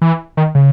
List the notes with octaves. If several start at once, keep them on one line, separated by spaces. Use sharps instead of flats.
E3
D#3
C#3